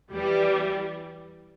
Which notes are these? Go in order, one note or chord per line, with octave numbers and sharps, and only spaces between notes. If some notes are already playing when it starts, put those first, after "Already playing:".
E2 E3 G3